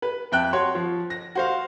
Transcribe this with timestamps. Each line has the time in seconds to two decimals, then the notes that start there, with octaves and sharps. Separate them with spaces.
0.02 B4
0.32 F2 E5 G5 A5 F#6
0.53 F#4 C#5 C6
0.75 F3
1.10 A#6
1.35 F#4 C5 F5